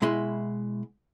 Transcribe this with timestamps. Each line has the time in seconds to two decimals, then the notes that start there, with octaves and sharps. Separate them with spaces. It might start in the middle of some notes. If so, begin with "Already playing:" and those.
0.02 B2 G#3 E4 C6